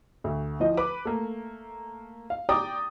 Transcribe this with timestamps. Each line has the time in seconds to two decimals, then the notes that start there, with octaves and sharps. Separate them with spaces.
0.24 D2
0.60 E3 F3 D#5
0.77 B4 B5 D6
1.05 A3 A#3
2.30 F5
2.49 G4 D5 G5 A#5 D6 D#6